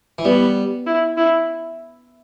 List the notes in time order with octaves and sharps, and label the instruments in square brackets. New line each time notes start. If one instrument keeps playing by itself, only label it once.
[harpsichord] E3
[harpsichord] G3 [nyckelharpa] B3
[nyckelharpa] E4
E4